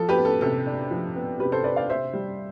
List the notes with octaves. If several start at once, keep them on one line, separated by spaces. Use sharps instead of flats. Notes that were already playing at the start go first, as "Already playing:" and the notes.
Already playing: F3 A4
G4 B4
B3
A4
C3 A4
D4
F3
B3
C3 G4 B4
A4 C5
D4 B4 D5
D5 F5
C3 C5 E5
G3